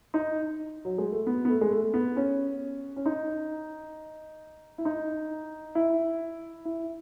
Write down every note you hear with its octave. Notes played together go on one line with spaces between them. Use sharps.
D#4
F#3
G#3
A3
B3
B3
A3
G#3
A3
B3
C#4
C#4
D#4
E4
D#4
E4
E4